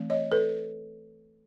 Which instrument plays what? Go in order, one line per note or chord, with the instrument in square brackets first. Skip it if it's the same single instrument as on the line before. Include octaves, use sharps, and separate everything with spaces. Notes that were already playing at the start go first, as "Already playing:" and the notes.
Already playing: [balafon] E3 A3 C4
C#5 D#5
A4 B4